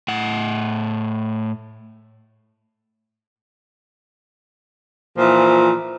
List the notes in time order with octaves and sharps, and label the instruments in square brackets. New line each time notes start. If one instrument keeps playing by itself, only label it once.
[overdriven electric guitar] A2 F#5
[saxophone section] A#2 E3 F3